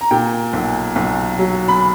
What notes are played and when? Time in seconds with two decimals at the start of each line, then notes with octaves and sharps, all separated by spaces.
0.01 A#5
0.11 A#2 G5
0.53 B1
0.96 B1
1.38 F#3
1.68 B5